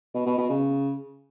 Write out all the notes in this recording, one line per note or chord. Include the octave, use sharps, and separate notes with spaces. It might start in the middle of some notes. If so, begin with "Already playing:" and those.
B2
B2
B2
C#3